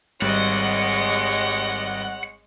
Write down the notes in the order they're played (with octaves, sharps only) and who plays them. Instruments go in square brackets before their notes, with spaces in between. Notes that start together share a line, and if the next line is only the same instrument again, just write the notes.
[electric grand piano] G#1 G3 [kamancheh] G#3 C#5 [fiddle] D#5 D6 [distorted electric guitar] F#5